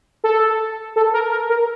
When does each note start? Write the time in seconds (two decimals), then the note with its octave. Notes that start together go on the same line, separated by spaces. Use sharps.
0.24 A4
0.96 A4
1.13 A#4
1.31 A#4
1.50 A#4